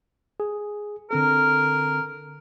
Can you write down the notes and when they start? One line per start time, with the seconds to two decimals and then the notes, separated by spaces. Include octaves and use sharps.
0.40 G#4
1.11 D3 C4 A4 A#4